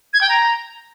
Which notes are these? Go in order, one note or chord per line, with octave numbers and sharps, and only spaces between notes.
G#6
G5
A#5